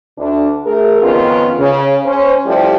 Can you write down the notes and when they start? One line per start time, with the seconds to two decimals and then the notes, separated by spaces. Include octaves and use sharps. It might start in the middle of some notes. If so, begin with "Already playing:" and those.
0.18 D2 D4
0.65 A3 G#4 A#4
1.02 F2 D#3 B3 C#4 F4
1.59 C#3
2.05 C#4 C5
2.46 F3 G3 A3 E4 G4